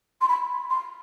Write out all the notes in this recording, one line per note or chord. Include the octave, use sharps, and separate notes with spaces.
C6
B5
C6